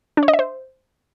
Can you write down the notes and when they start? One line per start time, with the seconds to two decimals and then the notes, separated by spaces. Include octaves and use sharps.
0.17 D4
0.23 C#5
0.28 D#5
0.33 E5
0.39 C5